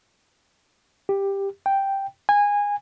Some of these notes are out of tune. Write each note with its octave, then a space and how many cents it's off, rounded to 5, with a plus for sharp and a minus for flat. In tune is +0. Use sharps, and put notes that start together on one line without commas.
G4 +10
G5 +0
G#5 -20